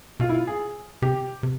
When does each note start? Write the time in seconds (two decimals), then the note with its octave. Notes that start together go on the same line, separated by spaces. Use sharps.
0.20 B2 F4
0.29 E4
0.34 F4
0.47 G#4
1.02 C3 G4
1.43 C3